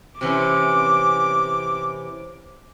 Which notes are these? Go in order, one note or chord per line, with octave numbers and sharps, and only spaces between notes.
C3 E3 C#4 D6